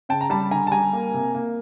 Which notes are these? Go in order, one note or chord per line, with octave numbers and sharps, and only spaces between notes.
C#3 G5 A5
A#5
G3 A5 B5
D3 G#5 A#5
A5
G3 G#5 A#5
A#3
C3
A#3